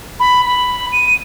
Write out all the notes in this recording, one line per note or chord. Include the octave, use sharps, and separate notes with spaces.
B5
B5
D#7